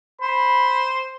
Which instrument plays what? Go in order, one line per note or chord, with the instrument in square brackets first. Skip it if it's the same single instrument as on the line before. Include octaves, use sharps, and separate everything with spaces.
[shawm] C5 [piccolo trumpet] B5